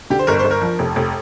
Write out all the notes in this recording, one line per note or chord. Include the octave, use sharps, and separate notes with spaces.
D3 G4
C5
G1 A#4
C5
G1
A#4
F3
F1
F1